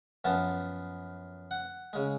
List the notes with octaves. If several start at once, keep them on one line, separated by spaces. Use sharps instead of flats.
F#2 F3 B3 A5
F#5
C#3 G#3